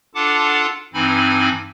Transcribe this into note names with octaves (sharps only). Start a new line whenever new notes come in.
D4 F4 A4 F#5 A5 D6
G2 E3 C4 D#4 G#5 B5